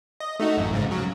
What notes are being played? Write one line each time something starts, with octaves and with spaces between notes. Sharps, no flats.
D#5
A3 D#4 F#4
A1 F#2
G#2 C#3
C#3 F#3